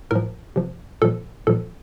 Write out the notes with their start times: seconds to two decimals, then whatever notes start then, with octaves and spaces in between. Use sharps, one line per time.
0.11 A2 F3 A#4
0.56 C3 F3
1.02 A#2 F3 A4
1.47 A#2 F3 A4